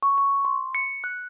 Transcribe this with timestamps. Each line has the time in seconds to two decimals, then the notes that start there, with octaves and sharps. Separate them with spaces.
0.03 C#6
0.18 C#6
0.45 C6
0.75 C#7
1.04 F#6